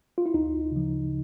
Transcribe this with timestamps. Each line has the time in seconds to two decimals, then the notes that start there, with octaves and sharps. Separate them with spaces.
0.18 F4
0.26 E4
0.34 D2 D#4
0.72 C#3 F3